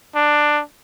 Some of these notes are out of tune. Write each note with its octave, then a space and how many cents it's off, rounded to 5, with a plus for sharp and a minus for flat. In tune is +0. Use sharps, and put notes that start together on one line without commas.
D4 +10